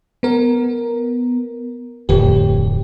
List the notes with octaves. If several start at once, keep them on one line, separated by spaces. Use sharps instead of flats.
B3 A#4
D1 F2 G4